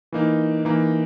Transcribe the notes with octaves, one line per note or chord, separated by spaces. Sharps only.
E3 A#3 D#4
E3 A#3 D#4